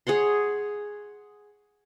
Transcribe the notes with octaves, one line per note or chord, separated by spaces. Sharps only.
G#4 C#5 F#5 C6